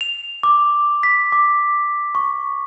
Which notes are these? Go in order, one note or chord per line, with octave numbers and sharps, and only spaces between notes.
F7
D6
B6
D6
C#6